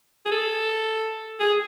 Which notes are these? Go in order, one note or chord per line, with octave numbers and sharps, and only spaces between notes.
G#4
A4
G#4